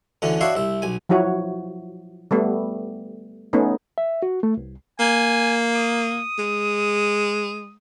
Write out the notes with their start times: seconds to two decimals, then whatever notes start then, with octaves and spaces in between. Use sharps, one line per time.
0.22 D2 D3 E3 C#4
0.41 D4 F#4 C#5 E5 F5 C6
0.55 C2 E5
0.82 B1 G#5
1.09 F3 F#3 E4 F#4 C#5
2.31 G3 A3 B3
3.53 A3 B3 C#4 D#4
3.98 E5
4.23 F#4
4.43 A3
4.57 C2
5.00 A#3 G#5
5.74 D#6
6.38 G#3